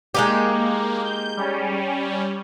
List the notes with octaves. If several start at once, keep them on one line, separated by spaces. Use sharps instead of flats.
G#3 A#3 D#4 G4
G6
G3 C#4